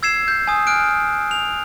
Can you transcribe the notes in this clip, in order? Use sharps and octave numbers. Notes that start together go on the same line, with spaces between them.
E6 G#6 C7 E7
G6
G#5 D#6
F6 F#6 D7
F7